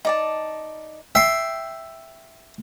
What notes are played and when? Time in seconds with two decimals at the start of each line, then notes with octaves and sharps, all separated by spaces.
0.05 D#4 D5 A5
1.15 E5 G5 C6